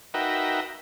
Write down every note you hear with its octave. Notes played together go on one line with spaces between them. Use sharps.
D#4 F#4 A#4 B4 E5 G5